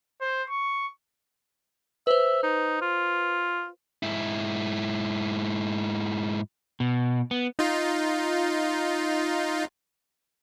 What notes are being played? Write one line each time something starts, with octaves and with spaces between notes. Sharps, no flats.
C5
C#6
B4 C5 E5
D#4
F4
G#2 E4
B2
B3
D#4 F4